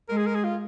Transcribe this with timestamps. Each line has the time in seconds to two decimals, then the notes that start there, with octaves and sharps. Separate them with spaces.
0.08 G#3 A#4
0.17 G#4
0.27 A#4
0.35 G#4
0.44 F4